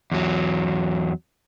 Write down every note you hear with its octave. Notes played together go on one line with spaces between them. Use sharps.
E2 F#3